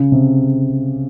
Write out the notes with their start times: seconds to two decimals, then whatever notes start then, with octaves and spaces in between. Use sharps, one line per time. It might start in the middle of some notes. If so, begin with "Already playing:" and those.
Already playing: C#3
0.12 C3